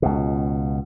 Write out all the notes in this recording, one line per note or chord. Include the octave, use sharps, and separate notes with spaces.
C#2 B2